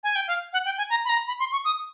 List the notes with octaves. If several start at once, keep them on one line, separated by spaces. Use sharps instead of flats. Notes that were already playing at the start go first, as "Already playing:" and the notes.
G#5
G5
F5
F#5
G5
G#5
A#5
B5
A#5
B5
C6
C#6
D#6